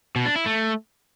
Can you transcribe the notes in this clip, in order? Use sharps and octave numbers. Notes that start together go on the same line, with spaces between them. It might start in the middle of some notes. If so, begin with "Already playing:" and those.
B2
D4
E4
A3